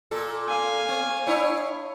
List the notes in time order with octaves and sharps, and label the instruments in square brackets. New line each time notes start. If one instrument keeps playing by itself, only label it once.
[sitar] A#2 A4
[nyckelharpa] F5 G#5
[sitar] C4
D4 E4 C#5